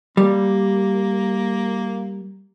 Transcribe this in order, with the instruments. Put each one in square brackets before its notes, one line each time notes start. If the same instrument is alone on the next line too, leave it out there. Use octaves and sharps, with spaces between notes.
[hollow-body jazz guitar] G3 [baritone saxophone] A#3